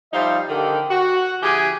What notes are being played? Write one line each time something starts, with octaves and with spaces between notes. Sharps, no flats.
F3 G3 D#4 C5 E5 F5
D3 D#3 G4
F#4
C#3 E3 G4 G#4 G#5